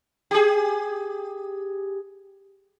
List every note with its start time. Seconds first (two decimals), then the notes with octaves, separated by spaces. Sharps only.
0.31 G4 G#4